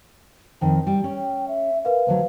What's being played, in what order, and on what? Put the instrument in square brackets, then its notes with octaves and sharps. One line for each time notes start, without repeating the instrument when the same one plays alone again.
[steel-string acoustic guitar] F2 D#3 [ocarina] G5
[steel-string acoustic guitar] G3 [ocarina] G5
[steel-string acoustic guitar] C#4
[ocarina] E5
[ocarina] A#4 [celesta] B4 F5
[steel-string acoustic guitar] D2 D3 F#3 [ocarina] C5